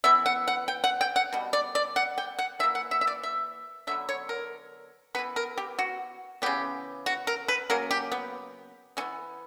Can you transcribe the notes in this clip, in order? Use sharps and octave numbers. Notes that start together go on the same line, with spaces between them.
E3 B3 E5
F#5
F#5
G5
F#5
G5
F#5
B2 G3
D5
D5
F#5
G5
F#5
E3 A#3 E5
F#5
E5
E5
D5
E5
D3 F#3 B3 E5
C#5
A#4
E3 B3 B4
A#4
G4
F#4
C#3 E3 B3 G4
F#4
A#4
B4
C#3 F#3 A#3 A#4
G4
B3
E3 B3 C#4